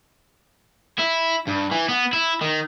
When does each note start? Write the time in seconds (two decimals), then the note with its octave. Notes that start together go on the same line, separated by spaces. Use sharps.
0.99 E4
1.47 G2
1.71 E3
1.89 B3
2.13 E4
2.41 D#3